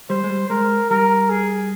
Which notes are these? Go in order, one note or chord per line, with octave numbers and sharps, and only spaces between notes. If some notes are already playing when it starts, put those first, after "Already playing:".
G3 C5
G#3
G3
G#3 A#4
G3 A#4
G#4